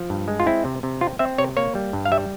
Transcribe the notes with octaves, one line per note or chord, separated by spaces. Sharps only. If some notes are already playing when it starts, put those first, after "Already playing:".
Already playing: F3
G2
G#3
F4
C4 E4
C3
C3
C4 F4
C4 E5
C3 C#5
A#3 C#5
G3
G2
F5
G3 E5